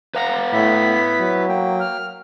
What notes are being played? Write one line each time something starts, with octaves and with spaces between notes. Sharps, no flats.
B4 F5 F#5 A#5
A2 E4 B6
F#3
A#3 G5
F6